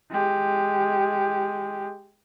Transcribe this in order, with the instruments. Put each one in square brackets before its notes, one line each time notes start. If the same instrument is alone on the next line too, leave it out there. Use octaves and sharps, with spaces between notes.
[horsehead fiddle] G#3 G4